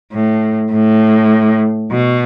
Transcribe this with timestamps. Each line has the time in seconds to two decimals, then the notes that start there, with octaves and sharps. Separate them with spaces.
0.14 A2
0.73 A2
1.91 B2